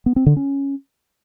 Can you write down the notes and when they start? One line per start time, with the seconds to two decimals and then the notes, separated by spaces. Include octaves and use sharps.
0.06 B3
0.16 C4
0.26 D3
0.36 C#4